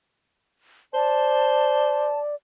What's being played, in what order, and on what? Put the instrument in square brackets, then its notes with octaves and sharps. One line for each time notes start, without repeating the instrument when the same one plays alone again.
[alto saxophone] C5 [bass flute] D5 [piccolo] A5